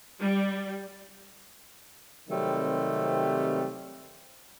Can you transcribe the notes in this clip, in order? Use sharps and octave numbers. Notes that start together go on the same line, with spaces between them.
G3
C3 D#3 F#3 G3 A3 C4